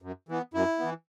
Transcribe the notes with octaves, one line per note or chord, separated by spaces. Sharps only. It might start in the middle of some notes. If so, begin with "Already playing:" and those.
F#2
E3 B3
F#2 E4
E3 B3